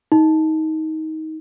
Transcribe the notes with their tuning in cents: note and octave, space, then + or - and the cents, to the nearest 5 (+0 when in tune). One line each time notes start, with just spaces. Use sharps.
D#4 +20